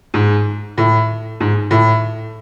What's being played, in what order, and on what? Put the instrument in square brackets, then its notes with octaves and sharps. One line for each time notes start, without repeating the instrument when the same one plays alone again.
[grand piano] G#2
A2
G#2
A2